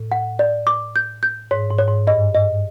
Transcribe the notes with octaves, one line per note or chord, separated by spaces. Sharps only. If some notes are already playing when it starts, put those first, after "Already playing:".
Already playing: A2
F#5
D5
D6
G6
G6
G#2 C#5
G#2
C#5
G#2
G2 D#5
D#5